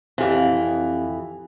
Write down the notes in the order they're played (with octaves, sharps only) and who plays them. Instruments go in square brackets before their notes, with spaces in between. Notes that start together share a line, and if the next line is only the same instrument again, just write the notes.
[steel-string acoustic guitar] F2 E3 [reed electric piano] C4 G4